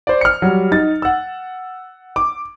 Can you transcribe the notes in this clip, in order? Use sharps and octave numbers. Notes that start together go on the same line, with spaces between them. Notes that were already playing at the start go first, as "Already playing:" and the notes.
C5 D5
F6 C#7
F#3 G3
D#4 A6
F#5 E6
D6